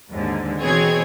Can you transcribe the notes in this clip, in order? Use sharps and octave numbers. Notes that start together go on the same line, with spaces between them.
D#2 G#2 D3
B2 E3 C4 G#4 C#5 G#6